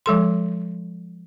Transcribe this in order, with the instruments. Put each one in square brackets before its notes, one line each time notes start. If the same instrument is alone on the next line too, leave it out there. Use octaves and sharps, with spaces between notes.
[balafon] F3 G#3 A4 C6